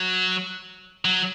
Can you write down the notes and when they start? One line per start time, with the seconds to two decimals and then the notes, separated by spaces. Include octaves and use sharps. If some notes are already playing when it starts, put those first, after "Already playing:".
Already playing: F#3
1.05 F#3